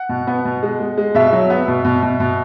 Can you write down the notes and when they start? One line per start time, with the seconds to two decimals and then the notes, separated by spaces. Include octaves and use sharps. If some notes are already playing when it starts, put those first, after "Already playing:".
Already playing: F#5
0.09 B2
0.27 B3
0.45 B2
0.63 G#3
0.80 G#3
0.98 G#3
1.15 B2 E5
1.33 F#3
1.50 B3
1.68 B2
1.85 B2
2.03 B2
2.20 B2